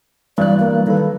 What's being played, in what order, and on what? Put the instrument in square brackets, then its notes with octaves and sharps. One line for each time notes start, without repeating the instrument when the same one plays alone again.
[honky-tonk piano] G2 [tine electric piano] E3 F#3 F#6 [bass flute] D5
[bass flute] A#3
[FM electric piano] D#3 B4 [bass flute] A4